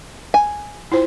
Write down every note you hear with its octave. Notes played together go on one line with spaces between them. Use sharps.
G#5
E4 F4 C5